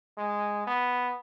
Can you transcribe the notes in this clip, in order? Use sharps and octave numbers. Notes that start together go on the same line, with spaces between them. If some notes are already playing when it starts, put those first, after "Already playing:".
G#3
B3